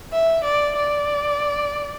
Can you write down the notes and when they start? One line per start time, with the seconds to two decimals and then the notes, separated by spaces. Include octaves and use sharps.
0.13 E5
0.45 D5
0.77 D5